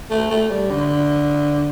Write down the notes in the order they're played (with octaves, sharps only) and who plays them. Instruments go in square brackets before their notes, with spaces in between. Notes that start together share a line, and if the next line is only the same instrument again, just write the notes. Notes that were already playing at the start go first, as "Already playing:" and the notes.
[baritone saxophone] A3
A3
G3
D3